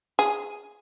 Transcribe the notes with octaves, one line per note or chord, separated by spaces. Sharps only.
G#4